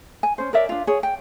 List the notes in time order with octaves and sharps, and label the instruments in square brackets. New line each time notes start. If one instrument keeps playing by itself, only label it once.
[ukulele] G#5
C#4 C5
A#4 C#5 D5 E5
D4 F4
G#4 C#5
G5